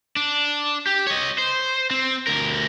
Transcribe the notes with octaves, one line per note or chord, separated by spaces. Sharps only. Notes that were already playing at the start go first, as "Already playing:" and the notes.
D4
G4
C#5 D#5
C5
C4
D2 A#4